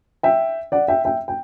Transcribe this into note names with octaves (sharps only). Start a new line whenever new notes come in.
E5 G5
D5 F#5
E5 G5
E5 G5
G5